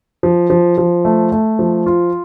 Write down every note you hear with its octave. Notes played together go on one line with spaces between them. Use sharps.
F3
F3
F3
A3
A3
F3
F4